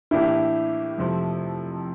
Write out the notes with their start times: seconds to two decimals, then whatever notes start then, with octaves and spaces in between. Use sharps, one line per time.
0.11 A2 E3 A#3 D4 E4 G4
0.98 F2 C3 F3 A3